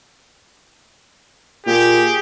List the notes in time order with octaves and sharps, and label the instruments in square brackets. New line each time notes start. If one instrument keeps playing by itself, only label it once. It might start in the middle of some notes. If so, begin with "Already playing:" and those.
[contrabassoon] A#2 [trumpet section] G4 G#4